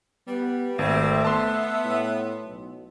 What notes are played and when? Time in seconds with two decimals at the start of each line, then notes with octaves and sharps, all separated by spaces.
0.28 G3 B3
0.79 G#1 A3 C4 E5
1.25 B3 A5 C6
1.85 A2
2.44 B1